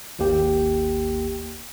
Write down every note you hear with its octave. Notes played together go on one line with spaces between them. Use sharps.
G#1 D#2 A#3 G4 G5